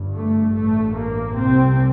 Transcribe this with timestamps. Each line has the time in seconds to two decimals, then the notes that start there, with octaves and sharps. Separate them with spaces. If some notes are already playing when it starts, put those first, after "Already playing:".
Already playing: G1 G2
0.12 A3
0.53 A1 G2 A3
0.94 A#3
1.35 C2 C3 C4